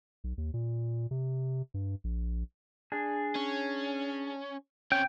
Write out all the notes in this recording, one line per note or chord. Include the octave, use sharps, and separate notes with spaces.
B1
D#2
A#2
C3
G2
A#1
D4 G#4
C#4
C3 C#4 G5